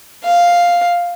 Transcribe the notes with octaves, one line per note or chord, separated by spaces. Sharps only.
F5